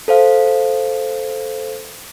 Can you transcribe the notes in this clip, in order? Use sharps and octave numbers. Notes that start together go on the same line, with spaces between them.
A4 C5 F5